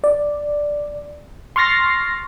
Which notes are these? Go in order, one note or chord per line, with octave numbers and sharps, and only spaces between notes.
D5
C6 C#6 F6 A6 A#6 C7